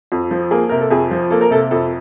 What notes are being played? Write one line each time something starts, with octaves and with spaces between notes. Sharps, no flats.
F2
F3
A#3 G#4
C3 A#4
A4
F2 G#4
F3
A#3 A4
A#4
C3 A4
F2 A4